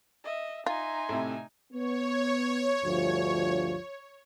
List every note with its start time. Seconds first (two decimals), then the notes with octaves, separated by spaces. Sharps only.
0.24 D#5 E5
0.66 D#4 F4 E5 G#5 A#5 C6
1.09 A2 C3
1.72 B3 C#5
2.83 D2 G2 F3